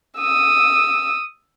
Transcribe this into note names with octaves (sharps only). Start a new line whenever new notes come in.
D#6 E6